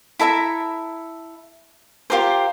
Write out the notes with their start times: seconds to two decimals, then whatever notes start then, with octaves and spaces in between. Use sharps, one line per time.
0.19 E4 A4 E5 A#5
2.10 F4 G4 A#4 C5